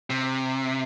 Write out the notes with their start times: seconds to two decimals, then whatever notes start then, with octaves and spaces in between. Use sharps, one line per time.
0.10 C3